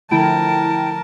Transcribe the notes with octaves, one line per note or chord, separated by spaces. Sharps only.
D3 F3 A3 E4 A#4 G5 A5 D7